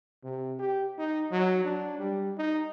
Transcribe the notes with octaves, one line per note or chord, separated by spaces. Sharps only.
C3
G4
D#4
F#3
D4
G3
D#4